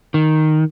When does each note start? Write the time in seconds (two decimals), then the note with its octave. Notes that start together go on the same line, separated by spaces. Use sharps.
0.14 D#3